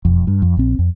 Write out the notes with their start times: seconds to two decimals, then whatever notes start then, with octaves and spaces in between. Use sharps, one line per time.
0.05 E1 F2
0.27 G2
0.42 F2
0.57 A#1 C4
0.79 F2